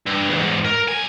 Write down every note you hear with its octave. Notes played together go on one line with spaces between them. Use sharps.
G2
E2 G#2
A#4
B1 G#5